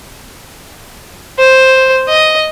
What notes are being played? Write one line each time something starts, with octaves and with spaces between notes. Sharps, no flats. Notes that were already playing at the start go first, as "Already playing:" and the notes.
C5
D#5